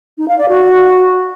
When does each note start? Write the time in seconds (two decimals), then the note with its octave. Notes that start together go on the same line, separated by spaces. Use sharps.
0.18 D#4
0.28 F5
0.38 D5
0.49 F#4